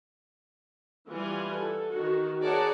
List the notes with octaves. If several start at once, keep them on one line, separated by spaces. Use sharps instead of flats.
E3 G3 F4 F#5 G#5
A4
D#3 F#4
G#4 A#4 C#5 D5 F#5 A5